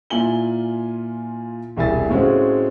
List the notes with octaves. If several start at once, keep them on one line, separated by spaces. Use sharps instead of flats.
A#2 E4 F4 G#5 F#7 G7
E1 C2 E4 E5 G#5 A6
A2 C#3 G#3 C4 F#4